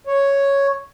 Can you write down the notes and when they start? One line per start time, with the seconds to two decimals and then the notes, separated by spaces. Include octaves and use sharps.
0.07 C#5